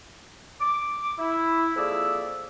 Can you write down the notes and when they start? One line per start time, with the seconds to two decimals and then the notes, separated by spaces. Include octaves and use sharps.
0.61 D6
1.19 E4
1.76 F2 A#3 G#4 D5 E5 E6